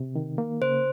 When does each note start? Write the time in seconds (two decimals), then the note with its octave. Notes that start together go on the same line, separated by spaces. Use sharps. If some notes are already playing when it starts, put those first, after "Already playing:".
Already playing: C3
0.15 D#3
0.38 A#3
0.61 C#3 C5